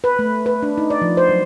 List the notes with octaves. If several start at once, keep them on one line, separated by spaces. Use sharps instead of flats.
B4
A3
B4
D4
D#4
D5
F3
C5
F#3